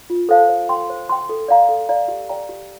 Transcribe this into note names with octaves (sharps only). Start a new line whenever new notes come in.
F4
A4 C5 F5 A5
C5
G5 C6
C5
G5 C6
A4
D5 F5 A#5
A4
D5 F5 A#5
G4
D5 G5 A#5
G4